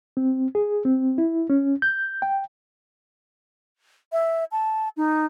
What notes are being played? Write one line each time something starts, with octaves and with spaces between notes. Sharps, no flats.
C4
G#4
C4
E4
C#4
G6
G5
E5
A5
D#4